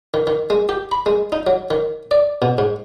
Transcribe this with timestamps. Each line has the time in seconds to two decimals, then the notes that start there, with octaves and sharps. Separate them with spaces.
0.14 D#3
0.27 D#3
0.50 G#3
0.69 G4
0.92 B5
1.06 G#3
1.32 D#4
1.47 F#3
1.71 D#3
2.11 D5
2.42 B2
2.58 G#2